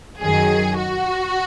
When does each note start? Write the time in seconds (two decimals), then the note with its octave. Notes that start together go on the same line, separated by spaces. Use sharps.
0.21 F#2 D#3 F#3 G#4
0.78 F#4